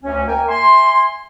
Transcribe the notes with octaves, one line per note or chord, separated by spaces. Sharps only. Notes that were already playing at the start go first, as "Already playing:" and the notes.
D2 C#4
A#3 A#4 G5 G#5
E5 G#5 C6